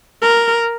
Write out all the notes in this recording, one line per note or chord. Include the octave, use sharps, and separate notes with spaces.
A#4